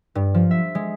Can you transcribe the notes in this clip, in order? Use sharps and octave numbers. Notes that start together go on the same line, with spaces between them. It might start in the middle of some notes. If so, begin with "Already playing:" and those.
G2
F3
E5
G#3